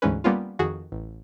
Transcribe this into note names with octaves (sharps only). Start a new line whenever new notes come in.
D2 G#2 E3 G#3 C#4 B4
G3 A#3 B3 C#4 F4
F2 D#3 F#4 G#4
A1